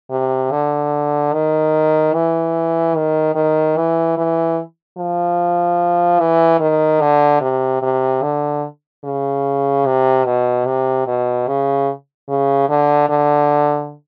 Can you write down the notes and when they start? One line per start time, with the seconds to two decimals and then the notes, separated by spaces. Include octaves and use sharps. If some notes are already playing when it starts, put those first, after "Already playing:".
0.11 C3
0.51 D3
1.33 D#3
2.14 E3
2.96 D#3
3.35 D#3
3.77 E3
4.17 E3
4.98 F3
6.20 E3
6.60 D#3
7.01 D3
7.41 C3
7.82 C3
8.22 D3
9.04 C#3
9.86 C3
10.25 B2
10.66 C3
11.07 B2
11.47 C#3
12.29 C#3
12.69 D3
13.09 D3